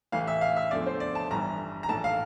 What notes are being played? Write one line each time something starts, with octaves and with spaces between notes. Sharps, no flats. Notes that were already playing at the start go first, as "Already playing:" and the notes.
A1 A2 E3 F5
E5
F5
E5
E2 D3 F3 A3 D5
C5
D5
A5
G1 G2 E3 A#5
A#5
A#1 A2 E3 A3 A5
F5